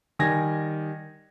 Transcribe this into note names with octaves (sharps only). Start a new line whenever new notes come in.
D#3 G3 G#5 G#6 A#6